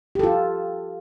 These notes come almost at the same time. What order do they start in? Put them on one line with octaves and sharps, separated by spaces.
G4 A4 F4